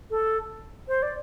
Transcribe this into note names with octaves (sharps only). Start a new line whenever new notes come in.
A4
C5
D5